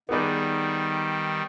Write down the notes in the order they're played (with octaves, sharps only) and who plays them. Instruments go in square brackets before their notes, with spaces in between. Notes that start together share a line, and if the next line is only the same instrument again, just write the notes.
[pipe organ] D#3 G3 [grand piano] B3 D#4 G#4 B4 D5